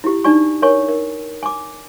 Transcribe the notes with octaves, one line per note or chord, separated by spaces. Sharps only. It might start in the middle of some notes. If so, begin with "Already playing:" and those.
E4 G4
D4 D#4 D5 G#5 C#6
A#4 C#5 G#5 C#6
A#4
G#5 D6